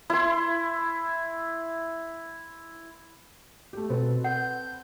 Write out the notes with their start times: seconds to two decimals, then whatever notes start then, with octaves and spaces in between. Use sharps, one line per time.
0.10 E4 C6
3.73 A3 G4
3.89 B2 C4 A4 B4
4.24 F#5 G6